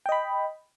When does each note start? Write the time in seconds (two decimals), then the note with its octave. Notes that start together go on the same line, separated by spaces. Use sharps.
0.06 G5
0.09 D#5
0.12 B5